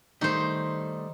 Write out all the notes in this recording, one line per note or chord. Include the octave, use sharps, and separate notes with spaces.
D#3 G3 A3 D#4 C5